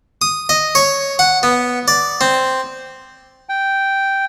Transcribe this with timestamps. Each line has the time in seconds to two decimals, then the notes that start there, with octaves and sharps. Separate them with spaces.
0.22 D#6
0.49 D#5
0.75 C#5
1.19 F#5
1.43 B3
1.88 D5
2.21 C4
3.49 G5